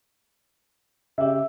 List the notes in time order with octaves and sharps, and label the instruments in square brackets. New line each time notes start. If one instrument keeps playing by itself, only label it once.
[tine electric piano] C#3 G4 [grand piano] E5